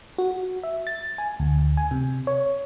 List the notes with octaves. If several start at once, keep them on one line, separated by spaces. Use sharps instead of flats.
F#4
E5
A6
G#5
D2
G#5
C3
C#5